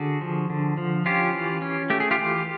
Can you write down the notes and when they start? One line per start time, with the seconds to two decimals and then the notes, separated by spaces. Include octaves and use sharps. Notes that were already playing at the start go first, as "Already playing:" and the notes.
Already playing: D3 F#4 G#4
0.21 F3
0.50 D3
0.78 F3
1.06 C#4 F4 G4
1.34 E3
1.62 C#4
1.90 A3 G4
2.00 G#4
2.11 F4 G4
2.18 E3